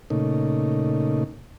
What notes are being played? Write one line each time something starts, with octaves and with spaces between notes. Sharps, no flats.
A#2 C#3 A3 D#4